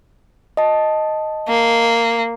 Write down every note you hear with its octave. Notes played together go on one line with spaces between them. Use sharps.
D#5 A5
A#3